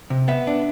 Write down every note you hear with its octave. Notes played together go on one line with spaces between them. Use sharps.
C3
B3 E5
D4